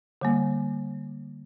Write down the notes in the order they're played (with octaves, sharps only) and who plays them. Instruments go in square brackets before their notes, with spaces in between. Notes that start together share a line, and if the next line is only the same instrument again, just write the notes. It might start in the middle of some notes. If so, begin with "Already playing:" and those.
[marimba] D3 G3 A#3